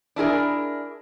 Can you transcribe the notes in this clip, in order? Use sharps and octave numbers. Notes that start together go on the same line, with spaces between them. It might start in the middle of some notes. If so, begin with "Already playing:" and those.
D4 E4 G#4 A#4